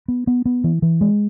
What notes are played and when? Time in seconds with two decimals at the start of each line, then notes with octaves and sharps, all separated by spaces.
0.08 B3
0.27 B3
0.46 B3
0.64 E3
0.82 E3
1.01 G#3